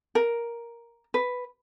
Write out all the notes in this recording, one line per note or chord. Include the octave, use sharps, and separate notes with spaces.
A#4
B4